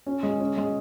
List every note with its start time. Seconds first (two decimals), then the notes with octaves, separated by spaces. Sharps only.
0.06 C#4
0.23 G#3
0.40 C#4
0.58 G#3